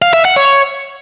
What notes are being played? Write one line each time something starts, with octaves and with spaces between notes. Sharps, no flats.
F5
E5
F#5
C#5